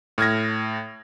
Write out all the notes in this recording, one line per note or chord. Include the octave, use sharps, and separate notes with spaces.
A2 F6 G#6 A#6